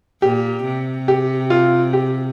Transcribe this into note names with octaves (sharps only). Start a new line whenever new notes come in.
A#2 G4
C3
G4
F4
G4